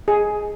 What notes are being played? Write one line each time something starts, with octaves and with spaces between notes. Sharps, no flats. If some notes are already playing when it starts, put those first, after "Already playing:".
G#4